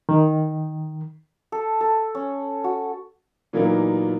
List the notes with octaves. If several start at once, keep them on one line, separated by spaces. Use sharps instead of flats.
D#3
A4
A4
C#4
F#4
A#2 E3 F#3 A#3 B3 D#4